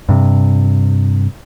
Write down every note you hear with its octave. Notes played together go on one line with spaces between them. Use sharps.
G2 C3